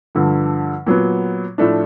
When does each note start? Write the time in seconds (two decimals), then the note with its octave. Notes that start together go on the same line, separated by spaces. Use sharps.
0.15 G2 D3 F3
0.87 A#2 F#3 B3
1.58 A2 F3 A3 D4